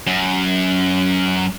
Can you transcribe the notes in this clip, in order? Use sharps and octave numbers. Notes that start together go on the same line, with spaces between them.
F#2